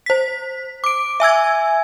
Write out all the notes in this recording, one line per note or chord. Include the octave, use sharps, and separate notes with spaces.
C5 B6
D6 D7
E5 G#5 E6 G#6